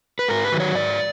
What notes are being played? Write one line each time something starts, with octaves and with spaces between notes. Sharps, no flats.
B4
G#2 A#4
B4
D#3 F#3
C#5
G#2 D5